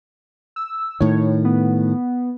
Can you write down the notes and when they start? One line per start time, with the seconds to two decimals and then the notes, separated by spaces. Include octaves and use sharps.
0.56 E6
1.01 A2 D#3 C#5
1.45 B3